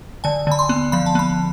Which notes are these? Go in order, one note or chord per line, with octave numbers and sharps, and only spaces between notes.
D3 G#5
D3 B5
C6
B3
F3 B5
A5
B3 B5